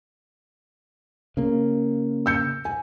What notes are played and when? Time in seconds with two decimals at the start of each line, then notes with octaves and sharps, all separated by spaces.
1.37 C#3 A#3
2.26 E6 G6 C#7
2.65 G#5